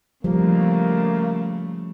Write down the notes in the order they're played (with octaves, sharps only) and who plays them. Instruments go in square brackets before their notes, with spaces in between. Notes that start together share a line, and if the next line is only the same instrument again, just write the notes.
[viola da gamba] C#3 A3 [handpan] F3 G3 [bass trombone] A#3